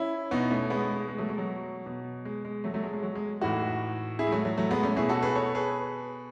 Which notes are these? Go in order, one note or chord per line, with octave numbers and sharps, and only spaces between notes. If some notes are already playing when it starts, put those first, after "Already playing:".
Already playing: C#4 E4
B2 B3 D#4
A3 C#4
G#3 B3
G#3
G#3
F#3 A3
G#3
F#3
B2
G#3
G#3
F#3 A3
F#3 A3
G#3
G#3
F#3
G#3
A2 E3 D#4 F#4
E4 G#4
G#3
F#3 A3
F#3
F#3 A3
G#3 B3
A3 C#4
B2 E4 G#4
F#4 A4
G#4 B4
A4 C#5
G#4 B4